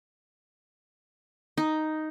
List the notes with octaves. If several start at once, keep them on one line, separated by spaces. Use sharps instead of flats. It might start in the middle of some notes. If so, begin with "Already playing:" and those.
D#4